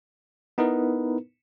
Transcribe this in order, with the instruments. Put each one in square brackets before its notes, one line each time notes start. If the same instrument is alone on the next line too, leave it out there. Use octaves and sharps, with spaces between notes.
[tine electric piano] B3 D#4 E4 A#4 B4